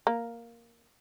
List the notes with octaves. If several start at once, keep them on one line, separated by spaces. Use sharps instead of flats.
A#3